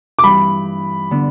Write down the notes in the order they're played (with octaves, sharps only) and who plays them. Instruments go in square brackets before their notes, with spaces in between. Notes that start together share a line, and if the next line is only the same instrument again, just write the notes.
[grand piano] D6
[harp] G2 E3 G3 [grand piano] B5
[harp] D3 B3